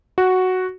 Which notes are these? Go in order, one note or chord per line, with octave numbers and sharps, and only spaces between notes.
F#4